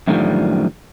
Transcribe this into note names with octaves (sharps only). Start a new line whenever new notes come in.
F#2 A2 D3 D#3 F3 G3